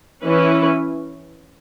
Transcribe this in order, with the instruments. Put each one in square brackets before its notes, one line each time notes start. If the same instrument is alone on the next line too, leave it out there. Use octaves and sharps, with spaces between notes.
[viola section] E3 C#4 E4 B4